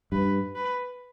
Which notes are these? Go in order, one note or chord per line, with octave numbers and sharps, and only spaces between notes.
G2 B4
B4